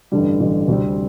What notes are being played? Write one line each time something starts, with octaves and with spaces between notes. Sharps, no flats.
A1 G2 D3 G3
A1 G2 D3 G3
D2 C3 G3 C4